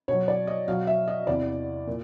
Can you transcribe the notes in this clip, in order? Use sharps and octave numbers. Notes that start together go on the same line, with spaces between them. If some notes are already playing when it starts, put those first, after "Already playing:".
B2 F#3 C#5
D5
D#5
B2 F#3 F5
E5
D#5
E2 C3 E3 D5
A#2